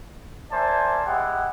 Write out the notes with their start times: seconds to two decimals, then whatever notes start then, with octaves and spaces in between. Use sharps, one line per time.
0.51 A#4 C5 D5 E5 G#5 A5
1.06 G#3 E4 G4 F#5